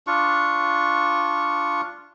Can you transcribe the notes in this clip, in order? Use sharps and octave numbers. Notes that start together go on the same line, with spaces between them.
D4 F4 C#6